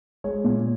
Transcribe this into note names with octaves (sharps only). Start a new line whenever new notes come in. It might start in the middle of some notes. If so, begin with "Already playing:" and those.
G#3 C#5
A#2